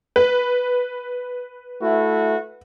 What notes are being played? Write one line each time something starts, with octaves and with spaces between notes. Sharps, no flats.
B4
A3 E4 F#4